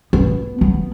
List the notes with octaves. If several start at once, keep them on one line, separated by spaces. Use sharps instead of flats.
B3
B3